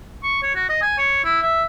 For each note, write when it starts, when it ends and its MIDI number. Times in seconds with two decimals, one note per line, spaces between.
0.23 0.41 85
0.42 0.52 73
0.55 0.66 66
0.69 0.77 75
0.82 0.97 80
0.98 1.24 73
1.24 1.40 64
1.42 1.64 76